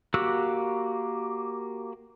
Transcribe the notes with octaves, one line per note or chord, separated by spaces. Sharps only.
A#3 F#4 G4 E6 F#6